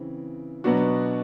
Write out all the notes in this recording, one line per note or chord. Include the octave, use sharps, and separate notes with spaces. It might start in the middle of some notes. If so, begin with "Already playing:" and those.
Already playing: C#3 E3 C4
B2 F#3 B3 D4 F#4